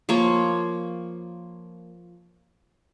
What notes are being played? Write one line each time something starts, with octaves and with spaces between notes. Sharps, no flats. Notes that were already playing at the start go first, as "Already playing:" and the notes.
F3 A#3 C#5